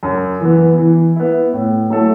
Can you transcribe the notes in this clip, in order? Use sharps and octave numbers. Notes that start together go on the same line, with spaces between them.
F#2
E3 B3
E3
B3 E4
A2
F#3 A3 E4 A4